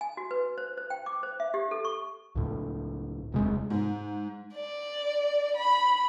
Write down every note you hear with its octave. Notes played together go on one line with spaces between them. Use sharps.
G#5
F#4
B4
C5
C5
G5
D6
C5
E5
G4
A4
C#6
C#2 A2
E1 C3 G#3
G#2
D5
B5